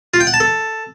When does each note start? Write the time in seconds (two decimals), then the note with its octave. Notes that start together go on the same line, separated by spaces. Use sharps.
0.14 F4
0.20 G5
0.27 F#5
0.34 A5
0.40 A4